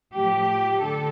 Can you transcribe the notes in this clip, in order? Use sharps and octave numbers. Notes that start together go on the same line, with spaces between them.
A2 F3 A3 G4
D3 A4